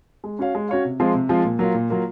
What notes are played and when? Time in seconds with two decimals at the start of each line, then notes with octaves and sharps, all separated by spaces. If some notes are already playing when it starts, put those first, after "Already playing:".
0.24 G#3
0.39 C#4 F#4 C#5 F5
0.55 G#3
0.69 C#4 F#4 C#5 F5
0.85 C3
1.00 F3 G#3 C4 F4
1.14 C3
1.29 F3 G#3 C4 F4
1.45 A#2
1.59 F#3 A#3 F4
1.74 A#2
1.90 F#3 A#3 F4